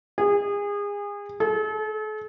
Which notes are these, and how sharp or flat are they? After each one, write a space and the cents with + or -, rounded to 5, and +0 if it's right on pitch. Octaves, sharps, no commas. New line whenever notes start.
G#4 -30
A4 -40